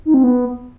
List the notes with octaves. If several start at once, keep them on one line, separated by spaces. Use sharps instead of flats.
D#4
C4
B3